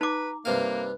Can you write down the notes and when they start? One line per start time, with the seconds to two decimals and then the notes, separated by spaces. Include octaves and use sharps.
0.01 D#4 B4 A#5 D6
0.45 G2 C3 A#3 B4 F5